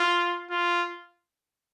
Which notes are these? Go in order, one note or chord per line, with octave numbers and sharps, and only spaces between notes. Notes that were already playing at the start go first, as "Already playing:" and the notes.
Already playing: F4
F4